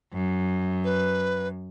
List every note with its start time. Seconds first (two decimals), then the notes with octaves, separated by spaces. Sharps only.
0.14 F#2
0.84 B4